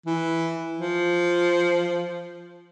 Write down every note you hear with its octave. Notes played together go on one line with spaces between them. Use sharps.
E3
F3